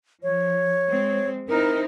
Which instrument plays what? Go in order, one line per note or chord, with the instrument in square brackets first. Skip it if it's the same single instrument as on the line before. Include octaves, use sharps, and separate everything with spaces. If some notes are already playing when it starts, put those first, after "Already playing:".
[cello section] F3 [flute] C#5
[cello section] G#3 C4
[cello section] C4 D#4 E4 [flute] A#4